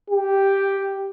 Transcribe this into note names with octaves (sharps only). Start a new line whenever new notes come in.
G4